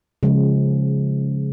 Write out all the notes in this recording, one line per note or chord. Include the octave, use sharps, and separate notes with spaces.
C#3 F3 G#3